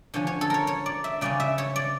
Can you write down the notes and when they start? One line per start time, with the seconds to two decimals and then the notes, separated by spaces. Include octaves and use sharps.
0.14 D3 F3 C#4 C#5
0.27 C#5
0.41 A4
0.50 A#4 C#5
0.67 C#5
0.86 D5
1.04 E5
1.21 C#3 G3 C#4 D5
1.40 E5
1.58 C#5
1.76 D5